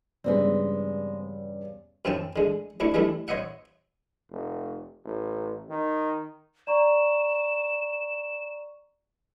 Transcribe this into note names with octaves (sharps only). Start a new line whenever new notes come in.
E2 G2 C#3 G#3 B3 C4 C5 D5
F#2 C4 C#4 G5 A5
D3 G#3
D2 D4 E4 C#6 D6
E3 G3 A3 D4 E4
C5 C#5 D#5 E5 F#5
F1
A1
D#3
D5 A#5 C#6 E7